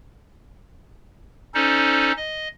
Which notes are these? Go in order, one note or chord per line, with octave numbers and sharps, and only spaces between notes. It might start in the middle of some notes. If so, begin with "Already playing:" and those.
C#4 D#4 A4 C5 D5
D#5